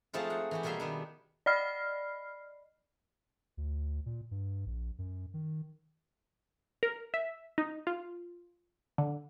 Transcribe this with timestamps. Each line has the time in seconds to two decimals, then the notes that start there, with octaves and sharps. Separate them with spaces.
0.13 F3 G#3 A3 C4 D#4 F4
0.30 F#5
0.51 E3 F#4 G4
0.63 B2 G3 A#3 G#4 E5 C6
0.80 D#3 B3 D4
1.46 D5 D#5 B5 F6 C7
3.57 D2
4.06 A#2
4.31 G2
4.66 A#1
4.98 F#2
5.34 D#3
6.83 A#4
7.14 E5
7.58 D#4
7.87 F4
8.98 D3